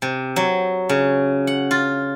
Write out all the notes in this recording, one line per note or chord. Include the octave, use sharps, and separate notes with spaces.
C3
F#3
C#3
F#5
F4